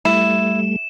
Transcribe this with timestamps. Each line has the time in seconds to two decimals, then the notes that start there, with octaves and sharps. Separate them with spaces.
0.05 G3 A3 E4 E7